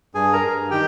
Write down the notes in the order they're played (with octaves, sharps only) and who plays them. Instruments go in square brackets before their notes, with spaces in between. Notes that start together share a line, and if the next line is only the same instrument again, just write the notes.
[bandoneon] G2 G#4 G#5
A#4 A#5
G2
D#3 G4 G5